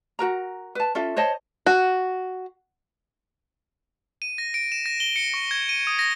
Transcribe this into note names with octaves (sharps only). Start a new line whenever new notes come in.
F#4 A#4 A#5
B4 A5
C#4 F4 A4 E5
C5 C#5 D#5 A5
F#4
D#7
A#6
D7
E7
A#6
G7
C#7
C#6
G#6
D#7
D#6
A#6